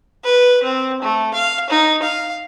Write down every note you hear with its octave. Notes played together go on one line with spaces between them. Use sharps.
B4
C4
A3
F5
D#4
F5